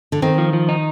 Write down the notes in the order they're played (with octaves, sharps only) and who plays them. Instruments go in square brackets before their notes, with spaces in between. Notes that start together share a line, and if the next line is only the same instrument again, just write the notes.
[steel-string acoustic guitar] D3
[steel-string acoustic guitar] D#3 [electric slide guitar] C4
[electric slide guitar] F3
F3
D#4